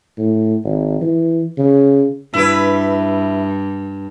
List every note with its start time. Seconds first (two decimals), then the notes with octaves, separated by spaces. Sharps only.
0.18 A2
0.64 G#1
1.01 E3
1.58 C#3
2.34 G2 E4 B4